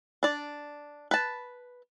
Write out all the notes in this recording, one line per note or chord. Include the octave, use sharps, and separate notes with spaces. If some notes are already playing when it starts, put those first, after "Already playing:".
D4 D5
B4 A5